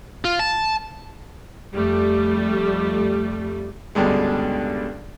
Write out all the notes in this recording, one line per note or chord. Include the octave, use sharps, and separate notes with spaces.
F4
A5
F2 G3 A3
C#2 G2 B2 D3 G#3